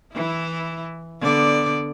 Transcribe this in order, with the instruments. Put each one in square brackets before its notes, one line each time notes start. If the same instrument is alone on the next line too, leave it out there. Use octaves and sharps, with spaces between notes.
[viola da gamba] E3 E4
D3 B3 D5